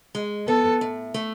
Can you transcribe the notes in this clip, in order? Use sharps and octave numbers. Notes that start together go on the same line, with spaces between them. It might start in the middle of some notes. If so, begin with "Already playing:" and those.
G#3
B3 A4
A2
A3